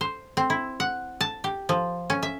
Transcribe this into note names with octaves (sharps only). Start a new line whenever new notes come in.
C5
C4
E4
F#5
A5
G4
F3
C#4
E5